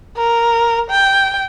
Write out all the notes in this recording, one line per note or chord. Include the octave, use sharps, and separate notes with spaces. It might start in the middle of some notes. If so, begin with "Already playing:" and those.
A#4
G5